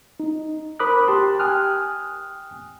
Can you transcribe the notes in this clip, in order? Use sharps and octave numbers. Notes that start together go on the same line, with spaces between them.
D#4
A#4 C5 B5 D6 D#6 F#6
G4 A5 C6
G5 G#5 D#6 F6 F#6